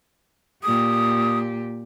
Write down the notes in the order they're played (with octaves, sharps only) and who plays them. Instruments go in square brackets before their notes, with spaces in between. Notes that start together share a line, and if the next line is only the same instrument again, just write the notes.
[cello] A#2 G4 [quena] D#6